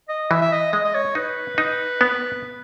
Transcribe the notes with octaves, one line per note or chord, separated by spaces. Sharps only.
D#5
E3 E5
E5
D#5
G#3 D#5
D#5
C#5
D#4 B4
D#4
B3